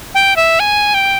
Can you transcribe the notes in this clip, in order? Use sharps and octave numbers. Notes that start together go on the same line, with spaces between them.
G5
E5
G#5
G5